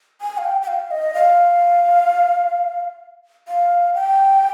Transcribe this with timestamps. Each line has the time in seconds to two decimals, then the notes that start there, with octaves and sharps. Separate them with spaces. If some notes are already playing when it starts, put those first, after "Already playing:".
0.21 G#5
0.38 F5
0.44 G5
0.62 G5
0.68 F5
0.91 D#5
1.14 F5
3.48 F5
3.94 G5